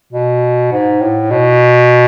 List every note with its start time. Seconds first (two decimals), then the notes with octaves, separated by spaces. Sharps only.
0.13 B2
0.72 G#2
1.01 A2
1.31 B2